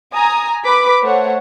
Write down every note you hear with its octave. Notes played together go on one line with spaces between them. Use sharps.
G#5 A#5 D#6
B4 B5 D6 B6
A3 C5 C#5 F#5